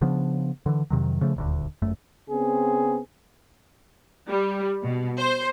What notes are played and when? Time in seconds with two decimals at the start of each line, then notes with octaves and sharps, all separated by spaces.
0.01 C#3 F3 B3 D4
0.66 D3 E3
0.90 F2 C3 D#3 F#3
1.21 C#3 F3 A3
1.36 D#1 D2 D3
1.82 G1 F#2 A3
2.30 C#3 B3 C4 G#4
4.29 G3
4.81 B2
5.18 C5